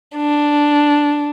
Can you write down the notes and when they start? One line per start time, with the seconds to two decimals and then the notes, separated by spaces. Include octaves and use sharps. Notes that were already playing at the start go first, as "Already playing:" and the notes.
0.17 D4